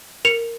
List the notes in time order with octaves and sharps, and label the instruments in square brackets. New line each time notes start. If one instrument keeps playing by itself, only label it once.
[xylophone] A#4 C#7 F7